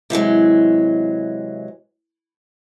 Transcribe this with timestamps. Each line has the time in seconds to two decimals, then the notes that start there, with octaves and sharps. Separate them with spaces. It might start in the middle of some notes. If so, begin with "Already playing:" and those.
0.10 C3 E3 F#3 G#3